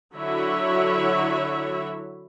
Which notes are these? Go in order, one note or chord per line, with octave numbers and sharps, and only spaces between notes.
D3 F#3 E4 F#4 C#5 E5